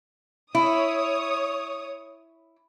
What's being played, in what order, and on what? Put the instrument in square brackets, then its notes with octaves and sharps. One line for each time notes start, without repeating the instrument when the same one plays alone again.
[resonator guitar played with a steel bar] E4 [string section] C#5 D#6